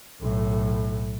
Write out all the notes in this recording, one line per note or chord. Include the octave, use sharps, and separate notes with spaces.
B1 A2